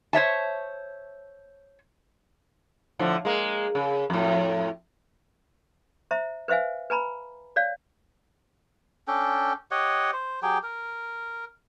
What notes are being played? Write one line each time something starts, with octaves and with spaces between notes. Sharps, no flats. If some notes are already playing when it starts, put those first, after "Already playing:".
C5 C#5 E5 A5
A2 D3 F3
G#3 A#3
C#3
F2 A2
C5 E5 A#5
B4 C5 E5 F5 G#5
B4 G#5 A#5 B5
C#5 D5 F5
C#4 D4 A4 G5
G4 C#5 D#5 F#5
C5
F#3 G4 G#4 G5
A#4